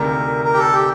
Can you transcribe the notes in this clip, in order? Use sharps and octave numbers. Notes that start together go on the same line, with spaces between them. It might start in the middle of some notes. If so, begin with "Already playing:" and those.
Already playing: D2 C3 D#3 A3 D4 A#4
A#4
G4
A4
G4